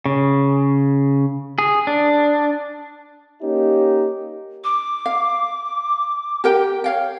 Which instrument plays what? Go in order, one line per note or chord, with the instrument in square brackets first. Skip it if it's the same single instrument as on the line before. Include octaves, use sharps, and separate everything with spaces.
[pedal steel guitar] C#3
G#4
D4
[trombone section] A#3 C#4 D#4 G4
[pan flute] D6
[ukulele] F5
G4 A#4 G5
C#5 F5 G5